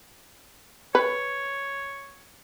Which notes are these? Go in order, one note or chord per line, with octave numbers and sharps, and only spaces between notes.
B4 C#5